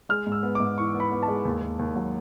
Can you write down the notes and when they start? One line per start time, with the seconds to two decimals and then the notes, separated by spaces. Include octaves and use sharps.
0.09 G#3 F6
0.26 G#2
0.32 E6
0.43 B3
0.55 D6
0.60 G#2
0.78 E3 C#6
0.95 B3
1.00 B5
1.12 B3
1.23 A5
1.28 G#3
1.45 D#2
1.62 D#2
1.79 D#2
1.95 F#3